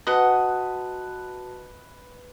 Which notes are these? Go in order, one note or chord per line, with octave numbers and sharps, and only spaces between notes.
F#4 B4 D#5 F#5 A5